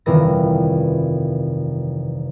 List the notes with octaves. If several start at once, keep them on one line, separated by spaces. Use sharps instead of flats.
G1 F2 C3 D#3 E3 A#6